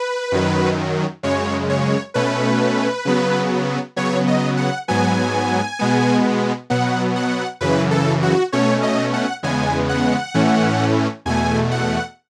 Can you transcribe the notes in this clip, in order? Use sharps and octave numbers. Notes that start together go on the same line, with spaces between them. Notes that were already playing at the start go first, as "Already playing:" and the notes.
Already playing: B4
F#2 D#3 F#3
F#2 C#3 G#3 C#5
C#5
B2 A3 C#4 B4
C#3 F#3 B3
C#3 F#3 B3 C#5
D#5
F#5
G#2 F#3 B3 G#5
B2 G#3 B3
B2 F#3 B3 F#5
F#5
F#2 C#3 E3 B4
A4
F#4
B2 A3 C#4 C#5
D#5
F#5
E2 C#3 G#3 B3 G#5
F#5
A2 E3 A3 C#4
E2 B2 A3 G#5
F#5